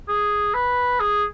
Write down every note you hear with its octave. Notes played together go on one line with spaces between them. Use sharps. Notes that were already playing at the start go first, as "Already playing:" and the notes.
G#4
B4
G#4